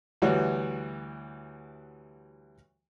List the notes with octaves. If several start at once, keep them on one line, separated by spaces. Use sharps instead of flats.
D2 E3 G3 F#4 C#5